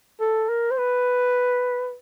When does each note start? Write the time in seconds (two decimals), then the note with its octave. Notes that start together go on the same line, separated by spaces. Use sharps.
0.20 A4
0.49 A#4
0.71 C5
0.78 B4